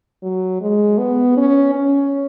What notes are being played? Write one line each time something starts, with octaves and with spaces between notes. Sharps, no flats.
F#3
G#3
B3
C#4
C#4